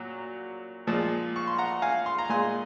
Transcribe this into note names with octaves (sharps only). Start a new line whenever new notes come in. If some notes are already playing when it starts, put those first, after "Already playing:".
Already playing: A#2 F#3
A#2 F3 G#3
C#6
C6
F#5 A#5
F5 G#5
C6
A#5
A#2 G#3 G#5 C6